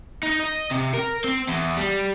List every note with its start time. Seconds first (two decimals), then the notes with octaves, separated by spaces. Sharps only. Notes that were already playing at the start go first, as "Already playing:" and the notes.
0.23 D#4
0.40 D#5
0.71 C3
0.94 A#4
1.24 C4
1.48 E2
1.77 G3